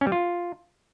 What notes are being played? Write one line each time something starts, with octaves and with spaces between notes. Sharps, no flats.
C#4
G3
F4